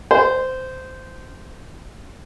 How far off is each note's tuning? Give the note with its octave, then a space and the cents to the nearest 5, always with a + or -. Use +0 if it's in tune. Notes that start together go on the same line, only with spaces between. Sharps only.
C5 -15